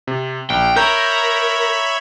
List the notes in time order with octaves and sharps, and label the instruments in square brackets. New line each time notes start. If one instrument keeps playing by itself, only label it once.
[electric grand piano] C3
[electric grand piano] A#1 [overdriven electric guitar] G5
[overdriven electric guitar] A#4 [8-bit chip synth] C#5 E5 B5 [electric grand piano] A#5 G6